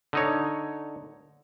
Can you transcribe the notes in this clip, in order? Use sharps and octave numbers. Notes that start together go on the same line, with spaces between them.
D3 D#4 C#5